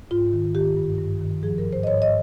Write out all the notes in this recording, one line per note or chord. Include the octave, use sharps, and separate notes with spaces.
G#2 F4
D#3
D#3 G4
G2
G2
D#3
F3 G#4
A#4
G#2
C5
D#5
G#2 C#5
D#5